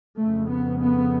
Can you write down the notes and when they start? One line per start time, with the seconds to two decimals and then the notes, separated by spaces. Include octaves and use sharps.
0.18 F2 C#3 A3
0.50 B3
0.82 B3